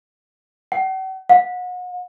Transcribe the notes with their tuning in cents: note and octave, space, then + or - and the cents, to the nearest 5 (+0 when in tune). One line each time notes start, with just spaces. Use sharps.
F#5 +45
F#5 -35